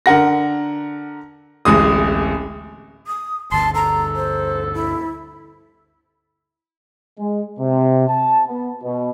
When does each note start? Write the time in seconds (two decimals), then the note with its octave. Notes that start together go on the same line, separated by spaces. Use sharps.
0.06 D3 A#4 F#5 A#6
1.65 D1 A1 G#3 D#6
3.07 D#6
3.52 G1 D2 A5 C6
3.75 A4 A#5
4.16 C5
4.74 E4
7.18 G#3
7.59 C3
8.08 A5
8.46 B3
8.83 B2